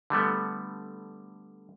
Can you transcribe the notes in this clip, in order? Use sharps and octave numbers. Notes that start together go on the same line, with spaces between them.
D3 G3 A3 B3